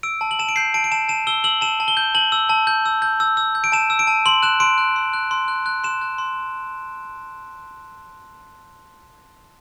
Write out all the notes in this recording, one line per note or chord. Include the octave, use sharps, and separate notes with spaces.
E6 D7
A5
F#7
A5 E7
D7
G6 C7
A5 D7
D7
A5 E7
A5 E7
E6 G7
E6 F#7
A5 E7
A5
G7
G6
A5 F#7
E6
A5
G6
E6
G6
E6
E6
G6
D7
A5 E7
E6
D7
A5
C6 F#7
F#6 E7
C6 D7
F#6
C6
F#6
C6
F#6
F#6
C6 E7
F#6
C6